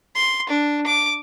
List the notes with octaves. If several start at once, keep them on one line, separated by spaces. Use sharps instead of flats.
C6
D4
D6